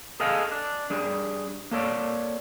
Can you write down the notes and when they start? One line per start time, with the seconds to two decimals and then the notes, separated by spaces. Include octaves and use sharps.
0.20 G#4 A4 D#5 F5 G#5
0.51 D4
0.90 G3 D4 G#4
1.71 A#3 A4 C#5 D5